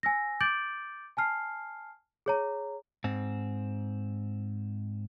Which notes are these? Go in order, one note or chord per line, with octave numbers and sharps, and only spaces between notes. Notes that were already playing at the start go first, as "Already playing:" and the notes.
G#5 E6 A#6
D6 G6 A6 D7 F#7
G#5 A5 F6 C7
G#4 C#5 A#5
G#2 C4